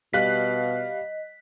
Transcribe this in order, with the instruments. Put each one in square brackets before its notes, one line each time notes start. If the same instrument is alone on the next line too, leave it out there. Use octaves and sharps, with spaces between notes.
[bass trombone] B2 [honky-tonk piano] G3 F5 F#6 [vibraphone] D#5 [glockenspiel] B6